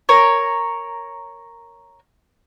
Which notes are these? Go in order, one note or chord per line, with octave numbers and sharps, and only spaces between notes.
A#4 C#5